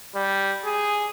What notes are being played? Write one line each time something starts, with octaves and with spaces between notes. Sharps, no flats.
G3
G#4